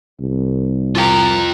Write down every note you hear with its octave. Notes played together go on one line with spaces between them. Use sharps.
C2
F4 A#4 G5